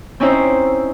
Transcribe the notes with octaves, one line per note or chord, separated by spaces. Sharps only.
C4 C#4 D#4 E4 C5